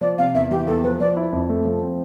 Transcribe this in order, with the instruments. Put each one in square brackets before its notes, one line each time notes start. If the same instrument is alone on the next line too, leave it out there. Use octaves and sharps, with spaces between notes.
[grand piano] F3 [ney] D5
[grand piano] C3 [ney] F5
[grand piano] E2 [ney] E5
[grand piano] E3 [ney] G4
[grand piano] E2 [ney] A4
[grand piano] F3 [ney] B4
[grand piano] F3 [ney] D5
[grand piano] E4
F2
A3
F3
C4